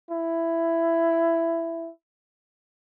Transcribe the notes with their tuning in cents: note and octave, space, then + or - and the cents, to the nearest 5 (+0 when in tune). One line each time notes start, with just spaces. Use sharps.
E4 +10